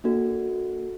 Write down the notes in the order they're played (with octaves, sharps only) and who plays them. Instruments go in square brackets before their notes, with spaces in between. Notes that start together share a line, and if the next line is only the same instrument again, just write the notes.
[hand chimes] A#3 D4 F#4 A4